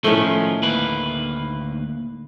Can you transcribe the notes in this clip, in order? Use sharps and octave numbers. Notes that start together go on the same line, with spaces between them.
A2 D#3 F3 A3 C#4
D2 A#3 B4